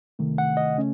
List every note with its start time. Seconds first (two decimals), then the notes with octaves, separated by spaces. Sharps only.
0.19 C#2 C3 D#3 A3
0.38 F#5
0.57 D#5
0.77 C#3 A3 C#4